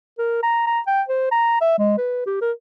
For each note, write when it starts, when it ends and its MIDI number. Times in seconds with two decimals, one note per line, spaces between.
0.19 0.40 70
0.43 0.64 82
0.67 0.80 82
0.87 1.02 79
1.09 1.29 72
1.32 1.60 82
1.61 1.76 76
1.79 1.98 56
1.98 2.26 71
2.26 2.37 67
2.42 2.52 70